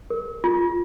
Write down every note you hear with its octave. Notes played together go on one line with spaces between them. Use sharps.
A#4
F4